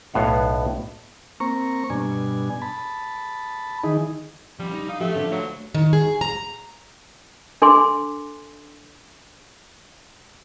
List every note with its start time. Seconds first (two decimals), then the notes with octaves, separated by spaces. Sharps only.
0.14 B1 A2 B3 F5 F#5
1.40 A#3 C4 A#5 C#6
1.90 G2 B2 D4 G#5
2.62 A5 B5
3.84 D#3 E3 D#4 G#4
4.60 F3 G3 C#4
4.74 D#4
4.89 D#4 F5
5.01 F3 A3 G4
5.15 D3 F3 D4 G4
5.32 F#3 A3 B4
5.74 D#3
5.93 G#4
6.21 A#5
7.62 D4 A4 G#5 C6 D6